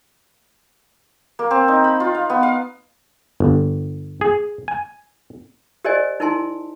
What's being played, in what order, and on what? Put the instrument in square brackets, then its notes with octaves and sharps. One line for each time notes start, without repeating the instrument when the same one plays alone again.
[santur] A#3
C4
D#4
B5
F4
F5
B3
F5
[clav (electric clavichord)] G1
G#4
G#5
[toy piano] G4 A#4 C5 D5 D#5 G#5
D#4 E4 A#4 G#5 A5 C6